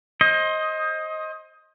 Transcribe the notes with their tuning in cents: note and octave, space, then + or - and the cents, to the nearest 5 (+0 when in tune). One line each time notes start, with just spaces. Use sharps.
C5 +30 D#5 +15